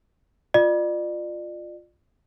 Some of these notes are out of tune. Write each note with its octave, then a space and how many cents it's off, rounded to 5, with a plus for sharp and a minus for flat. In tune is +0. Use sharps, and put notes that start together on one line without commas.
F4 +5 D5 +40